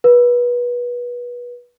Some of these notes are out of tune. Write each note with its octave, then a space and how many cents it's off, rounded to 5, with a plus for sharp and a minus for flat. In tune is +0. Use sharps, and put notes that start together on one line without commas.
B4 -25